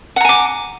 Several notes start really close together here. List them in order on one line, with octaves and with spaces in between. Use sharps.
F#5 A#5 G#5 D6